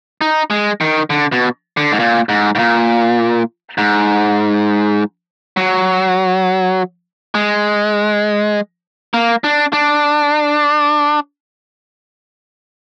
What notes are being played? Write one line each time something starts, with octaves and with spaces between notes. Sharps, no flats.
D#4
G#3
D#3
D3
B2
D3
G#2
A#2
G#2
G#2
A#2
G#2
F#3
G#3
A#3
D4
D4